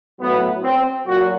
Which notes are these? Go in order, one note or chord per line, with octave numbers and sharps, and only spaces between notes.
A2 F#3 B3
C4
A#2 F#3 F#4